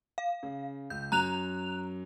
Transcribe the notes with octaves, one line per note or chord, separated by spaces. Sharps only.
F5
C#3
C#2 G6
F#2 A#5 F#6 F7